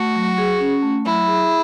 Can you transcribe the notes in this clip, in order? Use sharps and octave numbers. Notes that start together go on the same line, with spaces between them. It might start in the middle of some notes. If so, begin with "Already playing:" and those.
Already playing: A3 F#4
F#3
G#4
C#4
A3
F#3 E4
G#4